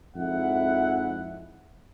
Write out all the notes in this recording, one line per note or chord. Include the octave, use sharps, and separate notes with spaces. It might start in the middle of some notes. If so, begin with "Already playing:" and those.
F2 G#2 E4 F#5